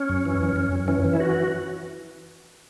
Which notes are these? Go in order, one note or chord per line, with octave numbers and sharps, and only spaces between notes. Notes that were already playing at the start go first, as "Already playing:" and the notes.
Already playing: C#4
F#2
E3
F#2
F#2
F#2
E3 C#4
E3
E4
F#4